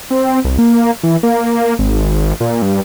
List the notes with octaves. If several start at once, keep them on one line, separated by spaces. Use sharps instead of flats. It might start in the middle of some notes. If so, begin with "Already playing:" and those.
C4
C2
A#3
E3
A#3
G#1
A#2
G2